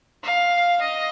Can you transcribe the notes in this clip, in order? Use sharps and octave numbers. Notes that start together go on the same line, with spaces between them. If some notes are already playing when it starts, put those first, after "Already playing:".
F5
D#5